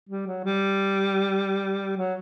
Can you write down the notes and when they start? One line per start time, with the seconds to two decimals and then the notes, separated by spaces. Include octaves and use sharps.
0.09 G3
0.27 F#3
0.44 G3
1.97 F#3